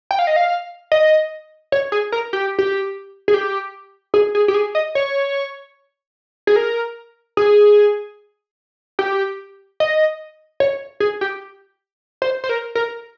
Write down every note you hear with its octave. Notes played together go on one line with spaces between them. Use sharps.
G5
F5
D#5
F5
D#5
C#5
G#4
A#4
G4
G4
G#4
G4
G#4
G#4
G4
G#4
D#5
C#5
G#4
A#4
G#4
G4
D#5
C#5
G#4
G4
C5
C5
A#4
A#4